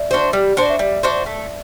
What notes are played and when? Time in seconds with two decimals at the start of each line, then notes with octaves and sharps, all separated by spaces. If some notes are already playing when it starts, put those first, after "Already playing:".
Already playing: D5 E5
0.11 D4 F#4 C5
0.33 G3 D5
0.57 D4 F#4 C5
0.70 E5
0.79 G3 D5
1.03 D4 F#4 C5
1.26 A3